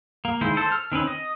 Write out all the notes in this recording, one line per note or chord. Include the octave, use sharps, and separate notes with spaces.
A#3
D#3 G#3 E4 C5
A4 C5
F6
D#3 C4 C#4 B4
D#5